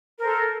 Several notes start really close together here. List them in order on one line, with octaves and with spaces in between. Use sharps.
A#4 C5 A4